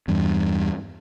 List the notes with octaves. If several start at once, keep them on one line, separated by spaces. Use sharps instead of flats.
E2 G2